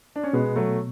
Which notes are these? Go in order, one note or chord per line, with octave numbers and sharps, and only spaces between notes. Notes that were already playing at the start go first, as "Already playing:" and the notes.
D4
C#4
B2 G#3 B3
F#3 A3